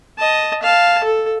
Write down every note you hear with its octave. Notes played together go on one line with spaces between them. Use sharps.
D#5 A5
F5 A5
A4